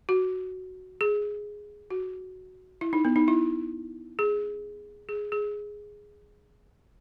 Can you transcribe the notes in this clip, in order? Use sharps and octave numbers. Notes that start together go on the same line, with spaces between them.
F#4
G#4
F#4
E4
D#4
B3
D#4
E4
G#4
G#4
G#4